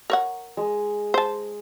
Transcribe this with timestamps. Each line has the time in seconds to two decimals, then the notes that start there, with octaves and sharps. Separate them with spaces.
0.10 A#4 C#5 F#5
0.57 G#3
1.14 C5 A5